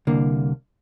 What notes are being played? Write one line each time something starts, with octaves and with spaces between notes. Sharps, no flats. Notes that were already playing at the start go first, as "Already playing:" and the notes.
C2 D3 A#3